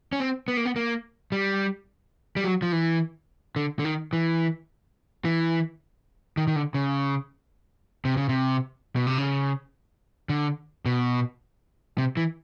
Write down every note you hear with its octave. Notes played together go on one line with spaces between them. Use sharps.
C#4
C4
B3
A#3
B3
A#3
G3
G3
F#3
F3
E3
D3
D3
D#3
E3
E3
D#3
D#3
D3
C#3
C3
C#3
C3
B2
C3
C#3
D3
B2
C3
E3